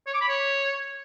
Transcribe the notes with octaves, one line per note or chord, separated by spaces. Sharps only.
C#5
D6
B5
C#5